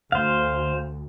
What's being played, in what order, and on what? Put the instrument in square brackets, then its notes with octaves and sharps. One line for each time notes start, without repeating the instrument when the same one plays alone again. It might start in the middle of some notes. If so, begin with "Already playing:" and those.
[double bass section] D2 [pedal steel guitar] C5 F5